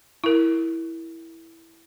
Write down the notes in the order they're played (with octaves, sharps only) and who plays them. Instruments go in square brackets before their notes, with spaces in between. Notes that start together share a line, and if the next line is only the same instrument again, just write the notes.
[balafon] E4 A#4